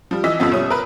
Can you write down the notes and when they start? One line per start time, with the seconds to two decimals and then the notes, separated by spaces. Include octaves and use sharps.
0.11 F3 G3
0.24 E3 D#5 E6 B6
0.40 F2 C#3 F3 B3
0.52 C2 G3 C#4 D#6
0.70 A#4 B4